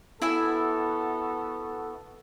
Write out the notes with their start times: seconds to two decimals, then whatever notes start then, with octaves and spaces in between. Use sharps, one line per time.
0.22 B3 E4 F#4 A4 E5 G#5